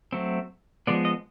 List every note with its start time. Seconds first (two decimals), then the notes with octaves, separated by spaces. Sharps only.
0.12 F#3 A3 C4
0.87 F3 G#3 B3 D5
1.05 D#5